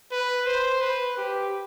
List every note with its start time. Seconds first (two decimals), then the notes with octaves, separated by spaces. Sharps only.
0.12 B4
0.46 C5
0.81 B4
1.17 G4